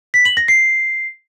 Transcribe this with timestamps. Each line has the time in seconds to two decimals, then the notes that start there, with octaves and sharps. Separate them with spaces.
0.14 B6
0.25 F#7
0.37 A#6
0.48 C7